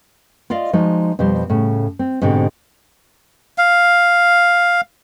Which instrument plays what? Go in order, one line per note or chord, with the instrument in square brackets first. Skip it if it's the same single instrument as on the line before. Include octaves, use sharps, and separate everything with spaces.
[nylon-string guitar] F4 D5 D#5 F5
F3 G#3 D#4 F#4
F2 B2 F3 G3 C5
A2 C#3
C4
G#2 B2 D3 C4 G4
[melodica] F5